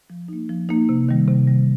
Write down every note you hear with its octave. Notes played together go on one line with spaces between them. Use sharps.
F3
A#3 D#4
F3
A#3 D#4
C3
D#3 G3
C3
D#3 G3